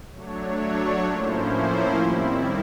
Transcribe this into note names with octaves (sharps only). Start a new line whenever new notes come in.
F#3 A3 D4 C#5
A2 F3 A#3 C#4 E4 C5
D#3 G3 C4 E4